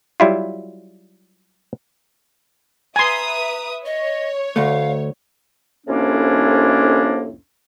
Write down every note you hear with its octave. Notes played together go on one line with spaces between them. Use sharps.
F#3 G3 E4 F4
B4 E5 G#5 A#5 C6 D#6
C#5 D#5
D2 A3 F5
C2 F2 A2 A#3 C#4 D4